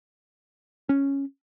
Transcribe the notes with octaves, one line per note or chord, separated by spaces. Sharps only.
C#4